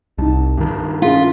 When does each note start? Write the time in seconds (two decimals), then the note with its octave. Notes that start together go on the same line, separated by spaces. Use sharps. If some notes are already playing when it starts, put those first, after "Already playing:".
0.18 C2 D#4 A5
0.58 G2 D#3
1.02 C#4 F4 G#4 B6